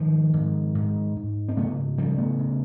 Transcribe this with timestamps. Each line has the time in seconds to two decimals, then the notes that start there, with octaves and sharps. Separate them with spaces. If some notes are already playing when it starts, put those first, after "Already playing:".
Already playing: G#2 D#3 F3
0.33 G#2
0.75 G#2
1.16 G#2
1.49 C4
1.57 C#3 A3 B3
1.98 C#3 F3 G3
2.18 A3 B3
2.39 C#3